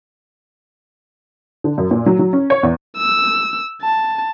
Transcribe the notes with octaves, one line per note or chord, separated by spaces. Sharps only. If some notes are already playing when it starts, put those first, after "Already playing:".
D3
F#2
A#2
F#3
F#3
C#4
C#5
E2
E6
A5